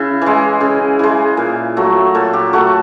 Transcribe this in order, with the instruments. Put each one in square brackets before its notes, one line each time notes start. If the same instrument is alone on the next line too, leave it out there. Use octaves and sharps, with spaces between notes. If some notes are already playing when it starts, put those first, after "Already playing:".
Already playing: [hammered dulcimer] C#3 E4
E3 G#3
C#3 G#4
E3 G#3
A#2
F#3 A3
A#2 A4
G4
F#3 A3 F#4